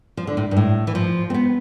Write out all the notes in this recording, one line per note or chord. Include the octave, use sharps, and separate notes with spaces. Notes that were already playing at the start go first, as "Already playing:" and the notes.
F3
D3
A2
G2
A2
E3
F3
C4
B3